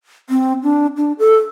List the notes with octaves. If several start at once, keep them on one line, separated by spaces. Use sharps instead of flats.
C4
D4
D4
A4